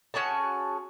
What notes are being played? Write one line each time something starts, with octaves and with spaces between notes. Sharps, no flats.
C#4 F#4 G#4 A5